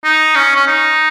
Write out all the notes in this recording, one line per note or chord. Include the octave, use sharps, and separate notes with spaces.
D#4
C#4
C#4
D#4